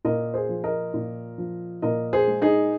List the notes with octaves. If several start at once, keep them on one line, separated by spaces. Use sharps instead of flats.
A#2 A#4 D#5
G#4 C5
F3
A#4 D#5
A#2
F3
A#2 A#4 D#5
G#4 C5
G#3
D#4 G#4